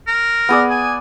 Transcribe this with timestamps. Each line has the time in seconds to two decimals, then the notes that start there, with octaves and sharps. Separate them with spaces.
0.07 A#4
0.49 B3 G#4 D5
0.70 G#5